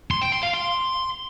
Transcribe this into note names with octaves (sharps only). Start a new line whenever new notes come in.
C6
G5
C6
F5
C6